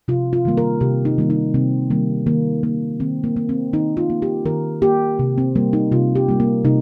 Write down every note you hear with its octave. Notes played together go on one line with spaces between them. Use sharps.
C3 F4
F4
D#3 G3 A#3
A#4
C3 G4
D#4
D#3 G3 A#3
D#4
C3 C4
D#3 G3 A#3
D#3 A#3
A#3
D#3 C4
A#3
A#3
C4
D#3 D#4
F4
A#3
G4
D#3 A#4
A#3 G4
C3
C4
G3 A#3
D#4
C3 F4
G4
G3 A#3
A#3
C3 D#4